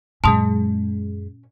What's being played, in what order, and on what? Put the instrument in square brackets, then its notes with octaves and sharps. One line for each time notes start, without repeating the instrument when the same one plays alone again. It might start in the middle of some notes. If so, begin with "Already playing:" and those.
[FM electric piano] F#2 G#3 [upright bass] A#2 C#4 [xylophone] A5 C6 D#6